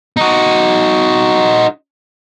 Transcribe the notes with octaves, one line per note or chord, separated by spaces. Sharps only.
D#4 F#4